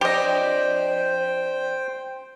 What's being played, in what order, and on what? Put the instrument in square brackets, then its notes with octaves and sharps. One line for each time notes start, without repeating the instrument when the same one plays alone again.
[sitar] F2 D4 [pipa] G4 D#5 [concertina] C5 G5